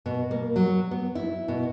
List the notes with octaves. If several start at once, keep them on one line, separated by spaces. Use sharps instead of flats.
B2
A#3
F#3
B3
E4
B2